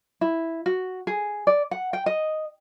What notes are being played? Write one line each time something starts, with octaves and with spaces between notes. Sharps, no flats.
E4
F#4
G#4
D5
F#5
G5
D#5